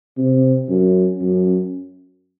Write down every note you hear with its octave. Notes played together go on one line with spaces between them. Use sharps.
C3
F#2
F#2